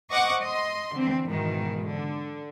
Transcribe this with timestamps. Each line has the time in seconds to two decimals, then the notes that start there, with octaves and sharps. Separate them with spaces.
0.11 C5 D#5 F#5 C#6 D6
0.40 D#5 C6
0.94 D3 E3 C4
1.30 G#2 B2 D#3 E3
1.87 D3